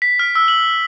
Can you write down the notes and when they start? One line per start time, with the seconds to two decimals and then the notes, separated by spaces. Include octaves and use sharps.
0.02 B6
0.19 F6
0.35 E6
0.48 F#7